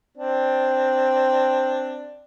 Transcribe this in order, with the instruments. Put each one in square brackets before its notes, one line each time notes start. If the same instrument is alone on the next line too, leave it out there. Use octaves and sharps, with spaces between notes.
[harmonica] C4 D4